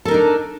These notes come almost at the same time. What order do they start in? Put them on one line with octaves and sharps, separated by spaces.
A4 A#4 D#4 D4